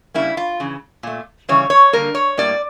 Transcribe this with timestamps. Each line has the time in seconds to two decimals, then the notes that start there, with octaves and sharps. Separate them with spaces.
0.14 C#3 G3 A#3 E4
0.37 F4
0.60 C#3 E3
1.03 A#2 A3
1.49 C#3 E3 G3 C#5
1.70 C#5
1.93 D3 G3 A#3 A#4
2.15 C#5
2.37 A2 G3 A#3 D5